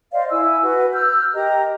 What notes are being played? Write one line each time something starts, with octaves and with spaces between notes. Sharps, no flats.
C5 D5 D#5 F5
E4 G#5 E6
F#4 B4
E6 F6 G6
G4 A#4 D#5 A#5